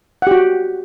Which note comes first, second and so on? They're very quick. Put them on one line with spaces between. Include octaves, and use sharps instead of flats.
F#5 G4 F#4